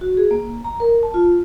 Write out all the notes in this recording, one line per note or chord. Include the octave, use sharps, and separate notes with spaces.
F#4
G#4
A#3
A#5
A#4
A5
F4